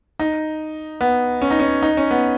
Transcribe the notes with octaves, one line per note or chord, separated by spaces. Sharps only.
D#4
B3
C#4
D#4
C#4
D#4
C#4
B3